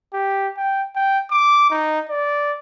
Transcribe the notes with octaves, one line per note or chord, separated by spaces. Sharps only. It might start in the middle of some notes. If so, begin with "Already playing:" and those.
G4
G5
G5
D6
D#4
D5